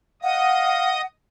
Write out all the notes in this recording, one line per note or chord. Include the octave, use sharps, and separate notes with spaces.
D#5 F5 F#5 D#6